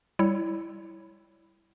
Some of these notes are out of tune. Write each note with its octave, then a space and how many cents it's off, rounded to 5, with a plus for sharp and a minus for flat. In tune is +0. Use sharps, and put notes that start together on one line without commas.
G3 +0 E4 +0 C#5 +0